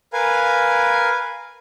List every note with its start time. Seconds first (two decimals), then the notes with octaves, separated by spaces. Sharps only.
0.13 A#4 B4 F5 G#5